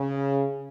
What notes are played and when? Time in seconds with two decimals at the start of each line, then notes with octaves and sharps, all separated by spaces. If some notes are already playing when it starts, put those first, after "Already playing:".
Already playing: C#3